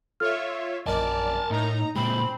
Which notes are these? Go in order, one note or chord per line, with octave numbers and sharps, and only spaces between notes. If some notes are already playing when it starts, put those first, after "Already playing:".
F4 A4 C#5 E5 F6
A#1 F#2 A#4 D5 D#5 G#5 A5
A2 D#4 A#5
A#2 G#3 C4 B5